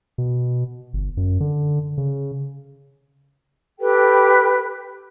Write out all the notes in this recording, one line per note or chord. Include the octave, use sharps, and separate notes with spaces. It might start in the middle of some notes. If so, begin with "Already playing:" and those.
B2
G1
F#2
D3
C#3
G4 A4 B4 G5